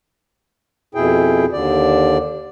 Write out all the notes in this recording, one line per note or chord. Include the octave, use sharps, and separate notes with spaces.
F2 B2 E4 G#4 G5
D#2 D3 D5